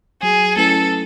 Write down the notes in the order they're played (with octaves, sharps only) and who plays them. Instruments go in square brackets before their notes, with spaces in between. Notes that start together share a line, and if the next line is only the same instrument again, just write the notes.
[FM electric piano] F#3 [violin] G#4
[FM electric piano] A3 C#4 E4 B4 [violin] A4